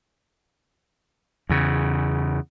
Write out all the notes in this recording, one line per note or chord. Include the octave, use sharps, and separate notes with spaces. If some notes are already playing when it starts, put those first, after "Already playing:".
E2 C#3